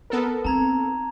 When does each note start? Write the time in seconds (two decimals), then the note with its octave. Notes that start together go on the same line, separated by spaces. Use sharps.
0.10 B3 A4 A#4
0.45 C4 D#4 A5 A#5 G#6